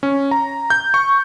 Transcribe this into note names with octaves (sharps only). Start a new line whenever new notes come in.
C#4
A#5
G6
C#6